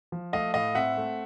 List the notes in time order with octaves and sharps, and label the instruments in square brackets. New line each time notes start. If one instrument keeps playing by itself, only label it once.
[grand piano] F3
A3 D#5 F5
A2 D#5 F5
C4 E5 F#5
A3